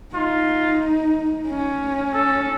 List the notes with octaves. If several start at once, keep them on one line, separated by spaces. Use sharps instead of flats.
D#4 F4
C#4
A4